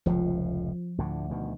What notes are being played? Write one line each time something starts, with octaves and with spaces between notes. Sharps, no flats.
F1 C#2 A2 F3
D2 A2 D3
D2 B2 D#3